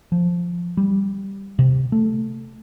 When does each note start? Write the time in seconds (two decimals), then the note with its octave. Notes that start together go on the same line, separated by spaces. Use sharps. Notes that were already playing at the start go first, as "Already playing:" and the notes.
0.12 F3
0.77 G3
1.59 C3
1.92 A3